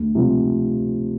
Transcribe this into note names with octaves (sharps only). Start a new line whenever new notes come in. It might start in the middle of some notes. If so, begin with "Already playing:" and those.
Already playing: D2
C3 F3